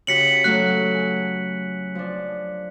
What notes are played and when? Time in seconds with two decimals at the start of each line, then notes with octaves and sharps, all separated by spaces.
0.07 C#3 F#4 G4 B6 C#7 F#7
0.44 F#3 A3 F#6
0.94 G#5
1.95 F3 D4